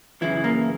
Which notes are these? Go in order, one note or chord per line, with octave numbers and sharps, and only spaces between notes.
F#2 C#3 E3 E4
A#3